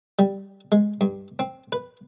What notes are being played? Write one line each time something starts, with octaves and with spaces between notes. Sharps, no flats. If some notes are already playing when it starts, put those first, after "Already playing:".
G3
G#3
G2
C4
B4